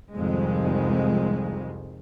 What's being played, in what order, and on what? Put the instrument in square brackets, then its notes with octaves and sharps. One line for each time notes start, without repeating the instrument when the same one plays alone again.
[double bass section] C2 F2 G#2 D#3 G3 G#3